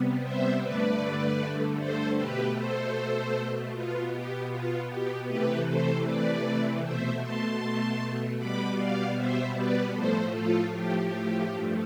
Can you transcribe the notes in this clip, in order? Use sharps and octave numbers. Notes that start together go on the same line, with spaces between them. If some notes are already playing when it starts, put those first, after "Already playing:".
Already playing: C3 G3 B3
C5 E5
G2 D3 A3 B4 D5
A4 C5
B2 A3 G4 B4
A4 C5
B2 B3 F4
G4
F4
G4
C3 E3 A3 G4 B4
A4 C5
B4 D5
B2 A3 C5 E5
A5 C6
B2 G3 B3 B5 D6
D5 F5
C5 E5
B4 D5
A2 F3 A3 A4 C5
F4 A4
G4
G2 F3 A3